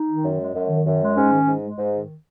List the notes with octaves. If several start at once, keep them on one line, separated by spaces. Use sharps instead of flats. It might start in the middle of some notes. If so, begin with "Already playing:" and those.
Already playing: D#4
D#3
F#2
G#3
F#2
D#3
F#2
G#3
G#2 C#4
D#3
G#2
G#3
G#2
D#3